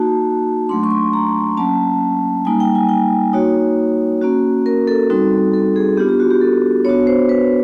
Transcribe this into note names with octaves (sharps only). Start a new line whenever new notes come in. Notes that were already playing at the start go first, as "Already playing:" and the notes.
Already playing: A#3 D#4 F#4 A5
F#3 A3 D4 C6
C#6
C6
A#5
F#3 A#3 C#4 A5
G3 A#3 D#4 G#5
G5
G#5
G5
A#3 D#4 F#4 C#5
A#3 C#4 F#4
A#4
A4
G3 C4 D#4 F#4
A4
G#4
B3 D4 F4 G4
G4
F#4
G4
A4
B3 D4 F#4 C#5
C5
B4